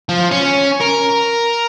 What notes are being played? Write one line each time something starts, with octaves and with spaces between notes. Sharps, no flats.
F3
C#4
A#4